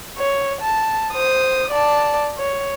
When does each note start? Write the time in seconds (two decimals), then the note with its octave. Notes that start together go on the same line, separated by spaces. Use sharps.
0.18 C#5
0.61 A5
1.13 C5 D#6
1.71 D5 A5
2.38 C#5